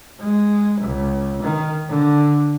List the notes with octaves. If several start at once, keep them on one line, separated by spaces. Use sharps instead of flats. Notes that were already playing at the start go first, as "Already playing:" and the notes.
G#3
C#2
D#3
D3